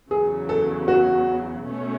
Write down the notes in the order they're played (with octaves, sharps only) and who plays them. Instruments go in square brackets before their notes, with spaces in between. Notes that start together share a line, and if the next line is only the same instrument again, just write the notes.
[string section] E2 C#3 F#3 [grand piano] G#4
[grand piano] A4
F#4
[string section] B2 A3 C#4